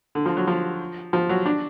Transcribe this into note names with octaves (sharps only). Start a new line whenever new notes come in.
D3
F3
F#3
F3
F3
F#3
D4